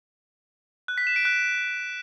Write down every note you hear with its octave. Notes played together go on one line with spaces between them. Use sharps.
F#6
B6
E7
D7
F#6